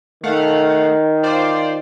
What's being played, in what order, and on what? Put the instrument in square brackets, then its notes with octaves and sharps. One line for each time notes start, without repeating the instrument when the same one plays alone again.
[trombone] D#3 [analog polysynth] A3 F5 F#5
[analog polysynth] F4 C5 D5